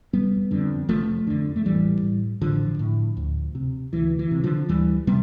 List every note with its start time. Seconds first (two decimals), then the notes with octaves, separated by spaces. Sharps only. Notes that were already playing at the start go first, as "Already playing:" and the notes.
0.13 F1 G3 B3
0.51 F2 D3
0.89 F1 F3 A3
1.27 F2 D3
1.56 A3
1.65 A1 E3 G3
2.03 A2
2.41 A1 D3 F3
2.79 A2
3.17 D2
3.55 C3
3.93 D2 E3
4.19 E3
4.31 C3
4.44 D3 F3
4.69 D2 E3 G3
5.07 C3 G3 B3